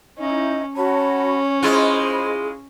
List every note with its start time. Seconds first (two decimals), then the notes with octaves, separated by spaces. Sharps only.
0.19 C#4 D#4 E4 D#5
0.76 C#4 F#4 C#5 A5 B5
1.63 G#3 E4 F4 G#4 C5 D#5 B5